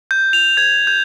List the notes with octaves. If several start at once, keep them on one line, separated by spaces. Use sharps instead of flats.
G6
F7
G#6
G6